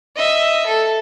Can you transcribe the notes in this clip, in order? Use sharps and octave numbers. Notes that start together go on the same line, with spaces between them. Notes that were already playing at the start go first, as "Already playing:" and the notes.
D#5 E5
A4